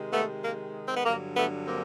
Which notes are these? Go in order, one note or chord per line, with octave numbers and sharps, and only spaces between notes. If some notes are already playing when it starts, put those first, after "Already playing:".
Already playing: C3 D#3 G#3
A3 B3
A#3
C4
B3
G2 D3 F#3 A#3
A3 B3
A#3 C4